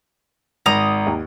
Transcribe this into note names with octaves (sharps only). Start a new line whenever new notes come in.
G#1 A#5 D#6
D#2